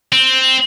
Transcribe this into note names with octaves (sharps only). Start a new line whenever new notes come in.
C4